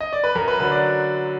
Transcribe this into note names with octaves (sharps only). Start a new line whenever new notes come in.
D#5
D5
B4
F#2 A#4
B4
D3 F#3 B4
D5